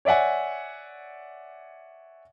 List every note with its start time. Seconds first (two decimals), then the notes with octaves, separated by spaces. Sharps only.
0.05 C#5 D5 E5 F#5 G#5